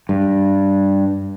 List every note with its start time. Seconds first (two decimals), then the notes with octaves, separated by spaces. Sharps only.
0.09 G2